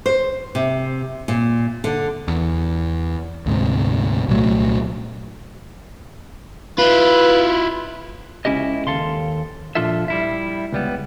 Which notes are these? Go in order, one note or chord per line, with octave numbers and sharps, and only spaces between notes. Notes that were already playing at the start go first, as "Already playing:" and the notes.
C5
C3
A#2
D3
E2
D2 G#2 C3
C2 A#2 F#3 A3
E4 F4 B4
C#2 C#4 E4 G4 D#5
D#2 A4 F5 C6
A#2 F3 D4 F4 A4 E5
G3 E4 E5
C#2 G3 B3